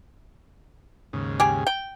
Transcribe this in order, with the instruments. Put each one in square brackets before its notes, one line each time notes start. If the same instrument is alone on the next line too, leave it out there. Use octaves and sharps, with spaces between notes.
[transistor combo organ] D#2 G#2 C#3
[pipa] G4 G#4 G#5
G5